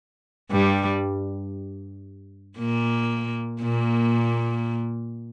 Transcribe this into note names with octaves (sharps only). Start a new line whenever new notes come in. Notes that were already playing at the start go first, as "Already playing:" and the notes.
G2 G3
A#2 A#3
A#2 A#3